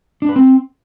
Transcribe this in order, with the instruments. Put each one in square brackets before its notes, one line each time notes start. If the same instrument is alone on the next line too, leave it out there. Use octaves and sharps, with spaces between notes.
[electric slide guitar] D4
B4
C4